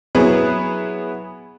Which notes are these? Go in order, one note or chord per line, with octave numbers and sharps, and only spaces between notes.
F#3 B3 E4 G#4 B4